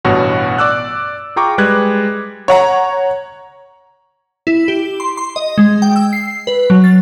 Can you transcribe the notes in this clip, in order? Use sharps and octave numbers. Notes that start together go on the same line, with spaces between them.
A1 G2 B2 F#4 C#5 F#5
D5 D6 E6 F#6
F4 G#4 G5 A#5 C#6 D6
G3 G#3 B4 F#6 G#6
C#5 F#5 A#5
E4
G4
C6
C6
D#5
G#3
G5
E6
C7
B4
F#3
A6